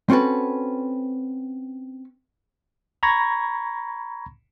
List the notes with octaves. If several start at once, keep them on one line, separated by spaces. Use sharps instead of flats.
C4 C#4 F#4 A4 B4
A#5 B5 C#6 G#6 A#6